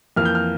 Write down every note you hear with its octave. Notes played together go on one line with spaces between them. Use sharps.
F2 E3 A#3 F6
G6
F6